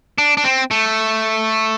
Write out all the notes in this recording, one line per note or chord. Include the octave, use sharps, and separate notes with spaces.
D4
D4
C4
A3